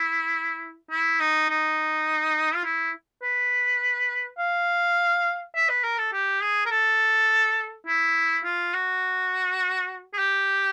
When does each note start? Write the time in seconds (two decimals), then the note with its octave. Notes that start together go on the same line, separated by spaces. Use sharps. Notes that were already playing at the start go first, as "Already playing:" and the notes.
Already playing: E4
0.91 E4
1.20 D#4
1.49 D#4
2.54 F4
2.65 E4
3.23 B4
4.38 F5
5.55 E5
5.69 B4
5.84 A#4
5.98 A4
6.13 G4
6.42 G#4
6.66 A#4
6.71 A4
7.86 E4
8.44 F4
8.74 F#4
10.14 G#4
10.18 G4